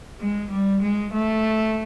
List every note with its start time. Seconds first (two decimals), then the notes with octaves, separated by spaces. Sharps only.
0.21 G#3
0.51 G3
0.82 G#3
1.13 A3